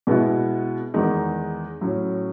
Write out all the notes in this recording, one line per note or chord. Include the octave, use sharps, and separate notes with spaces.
B2 G#3 B3 E4
E2 D#3 G#3 D#4
A2 F#3 C#4